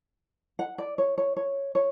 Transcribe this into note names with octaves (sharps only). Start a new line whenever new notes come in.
F#5
D5
C#5
C#5
C#5
C#5